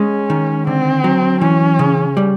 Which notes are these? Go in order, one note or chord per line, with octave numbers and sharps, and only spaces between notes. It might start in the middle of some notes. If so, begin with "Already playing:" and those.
Already playing: G#3 C#4
D#3
D3 C4
F#3
E3 C#4
C#3
G3